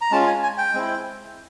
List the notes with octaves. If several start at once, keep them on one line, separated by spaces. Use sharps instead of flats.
A#5
G#3 C#4 F4 A5
G#5
G#5
G5
G#3 C4 E4